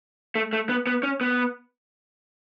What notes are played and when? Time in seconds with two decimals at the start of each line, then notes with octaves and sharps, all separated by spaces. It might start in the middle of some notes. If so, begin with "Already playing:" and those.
0.35 A3
0.53 A3
0.69 B3
0.87 B3
1.03 C#4
1.21 B3